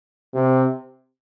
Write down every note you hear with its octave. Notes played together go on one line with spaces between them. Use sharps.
C3